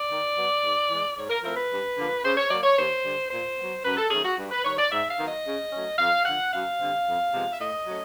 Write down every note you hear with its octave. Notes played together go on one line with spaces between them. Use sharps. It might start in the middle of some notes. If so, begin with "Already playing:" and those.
Already playing: D5
D#3
F#3 B3
G#2
E3 G#3
G#2 C#5
A#4
F3 A3 C4 E4 A#4
B4
G2
D3 F3 A#3
C#3 C5
C#5
F#3 A#3 D5
C#5
D#2 C5
D3 G3
A#2 C5
F#3 B3
F#2 B4
A4
D#3 F#3 A3 C#4 G#4
F#4
G2
B4
D#3 G3 C#5
D5
G#2 E5
F5
D#3 F#3 B3
D#5
C#3
F#3 A3 C#4
F2 F5
D3 F3 F#5
F#2 F5
D3 G3 C4
F2
C3 F3 G#3 B3
E5
A2 D#5
F#3 A3 C#4